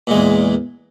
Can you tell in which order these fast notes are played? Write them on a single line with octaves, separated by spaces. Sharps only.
A#2 G#3 E2